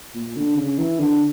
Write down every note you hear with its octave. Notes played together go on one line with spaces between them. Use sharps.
A#2
D3
C#3
E3
D3